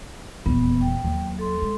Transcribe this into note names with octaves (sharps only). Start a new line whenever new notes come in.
D#1 E2 B3
G5
D#2 F#3
A4 C6
G#3